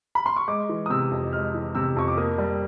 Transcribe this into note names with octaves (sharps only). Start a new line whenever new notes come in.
B5
C6
C#6
G#3 D6
E3
D#6
C3 E6
F2
G#3 F6
E3
C3 E6
F2 C#6
D6
A#3 D#6
G3